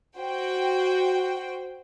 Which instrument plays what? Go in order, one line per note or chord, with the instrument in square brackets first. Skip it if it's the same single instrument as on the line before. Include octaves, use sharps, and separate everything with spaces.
[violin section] F#4 C5 G5